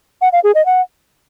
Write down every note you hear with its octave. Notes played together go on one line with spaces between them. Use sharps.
F#5
F5
G#4
D#5
F#5